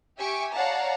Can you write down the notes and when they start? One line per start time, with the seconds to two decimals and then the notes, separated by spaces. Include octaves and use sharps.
0.17 G4 E5 G#5 C#6 D6
0.54 C#5 D5 F5 F#5 A5 A#5